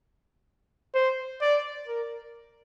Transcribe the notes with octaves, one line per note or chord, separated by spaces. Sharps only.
C5
D5
A#4